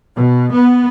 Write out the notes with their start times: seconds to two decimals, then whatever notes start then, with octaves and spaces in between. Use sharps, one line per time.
0.15 B2
0.52 B3